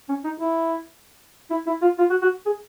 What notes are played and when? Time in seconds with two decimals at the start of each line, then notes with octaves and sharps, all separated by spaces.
0.09 C#4
0.24 D#4
0.40 E4
1.51 E4
1.67 E4
1.82 F4
1.99 F4
2.10 F#4
2.22 F#4
2.46 G#4